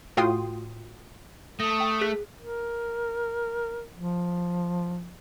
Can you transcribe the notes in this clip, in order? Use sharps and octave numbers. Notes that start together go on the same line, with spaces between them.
A2 F4 F#4 G5 C6 D#6
A3 D#6 A#6
G5
G#4 F#6 B6
A#4
F3